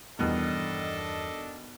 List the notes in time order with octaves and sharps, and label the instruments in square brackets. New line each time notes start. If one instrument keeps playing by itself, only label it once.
[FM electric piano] E2 G2 [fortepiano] B2 D#3 [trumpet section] D4 A4 D#5